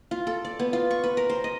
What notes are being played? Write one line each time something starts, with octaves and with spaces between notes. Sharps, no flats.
F4
A4
D5
B3
F4
C#6
B4
A#4
C5
D#5